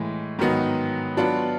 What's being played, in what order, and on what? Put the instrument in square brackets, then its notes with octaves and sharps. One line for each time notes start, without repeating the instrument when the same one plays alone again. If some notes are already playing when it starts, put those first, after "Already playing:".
Already playing: [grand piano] A2 E3 G#3
G#2 D#3 F#3 B3 D#4
F#3 B3 D4 F4